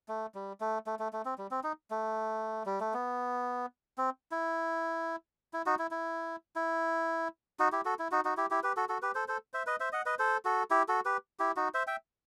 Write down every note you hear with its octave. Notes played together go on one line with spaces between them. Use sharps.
A3
G3
A3
A3
A3
A3
C4
G3
C4
D#4
A3
G3
A3
B3
C4
E4
E4
D#4 F#4
E4
E4
E4
D#4 F#4
E4 G4
F#4 A4
E4
D#4 F#4
D#4 F#4
E4 G4
E4 G4
G4 B4
F#4 A4
F#4 A4
G4 B4
A4 C5
A4 C5
C5 E5
B4 D#5
C5 E5
D#5 F#5
B4 D#5
A4 C5
F#4 A4
E4 G4
F#4 A4
G4 B4
E4 G4
D#4 F#4
C5 E5
E5 G5